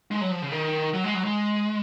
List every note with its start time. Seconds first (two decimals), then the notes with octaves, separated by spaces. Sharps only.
0.11 G#3
0.21 F#3
0.31 F3
0.42 C#3
0.52 D#3
0.94 F#3
1.04 G#3
1.14 F#3
1.24 G#3